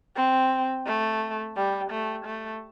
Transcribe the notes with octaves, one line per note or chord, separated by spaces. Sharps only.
C4
A3
G3
A3
A3